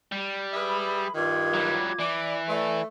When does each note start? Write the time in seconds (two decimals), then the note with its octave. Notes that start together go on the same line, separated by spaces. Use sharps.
0.12 G3
0.53 G#4 B4 E5 B5
1.15 G2 D#3 F4 D6 G#6
1.54 F#3 G3
1.99 E3 D5
2.48 A3 B4 D5